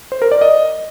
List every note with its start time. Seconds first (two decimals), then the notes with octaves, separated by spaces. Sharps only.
0.12 C5
0.22 A#4
0.32 D5
0.41 D#5